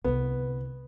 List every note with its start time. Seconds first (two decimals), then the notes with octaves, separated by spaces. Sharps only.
0.04 C2 D3 B3